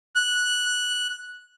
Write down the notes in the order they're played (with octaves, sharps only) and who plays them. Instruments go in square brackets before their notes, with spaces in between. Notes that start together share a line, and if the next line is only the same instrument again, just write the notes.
[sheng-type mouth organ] F#6